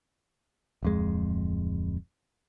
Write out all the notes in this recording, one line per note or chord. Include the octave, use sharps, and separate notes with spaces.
D1 F2 G#3